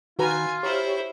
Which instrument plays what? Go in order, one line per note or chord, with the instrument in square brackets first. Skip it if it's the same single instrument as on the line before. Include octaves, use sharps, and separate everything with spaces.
[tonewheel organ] D#3 [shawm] F4 [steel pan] F#4 B4 A#5 [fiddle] G#5
[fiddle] E4 C5 [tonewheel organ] G4 C#5